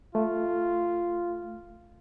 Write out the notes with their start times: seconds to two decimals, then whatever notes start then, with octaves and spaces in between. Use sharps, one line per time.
0.15 A3 F4